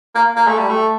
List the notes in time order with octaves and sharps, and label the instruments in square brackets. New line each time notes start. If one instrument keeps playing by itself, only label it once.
[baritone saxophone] A#3
A#3
A3
G3
A3